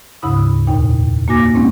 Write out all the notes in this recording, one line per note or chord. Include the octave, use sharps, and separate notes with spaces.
D2 G#2 C#3 E4 B5 D#6
E2 A#2 D#4 G5
A#3 D#4 F#4 G#5 D6 A#6
G#3 A#3 C4 C#4 D#4